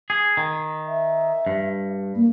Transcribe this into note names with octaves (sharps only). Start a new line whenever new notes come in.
G#4
D#3
E5
G2
A#3